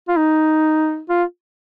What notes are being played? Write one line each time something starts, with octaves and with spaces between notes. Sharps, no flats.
F4
D#4
F4